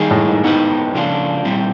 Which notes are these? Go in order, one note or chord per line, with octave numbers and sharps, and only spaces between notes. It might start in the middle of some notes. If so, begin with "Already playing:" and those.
Already playing: D#3 G3 A#3 D#4 G#4
A2
G#2
G#2 B3 D#4 G4 B4
C#3 F3 A#3 D4 F4
A#2 G3 C4 E4 G4